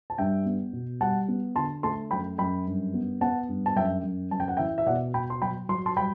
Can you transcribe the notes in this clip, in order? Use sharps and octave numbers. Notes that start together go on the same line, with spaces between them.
A5
G2 E5 G5
B3
B2
G3 F#5 A5
B3
D3 A5 C6
A3 A5 C6
F#2 G5 B5
F#2 G5 B5
G2
B3
B3 F#5 A5
G2
A5
F#2 E5 G5
F#2
F#2 A5
G5
F#5
E3 E5 G5
E5
B2 D5 F#5
B2 G5 B5
C6
F#3 G5 B5
F#3 C6
A5 C6
G3 G5 B5